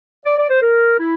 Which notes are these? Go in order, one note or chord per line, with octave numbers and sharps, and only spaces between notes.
D5
D5
C5
A#4
E4